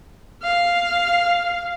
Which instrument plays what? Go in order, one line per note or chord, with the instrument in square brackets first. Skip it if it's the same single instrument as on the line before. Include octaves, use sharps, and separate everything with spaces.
[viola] F5